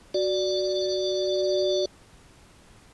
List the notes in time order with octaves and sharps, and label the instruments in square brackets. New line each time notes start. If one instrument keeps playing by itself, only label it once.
[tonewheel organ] F#4 D5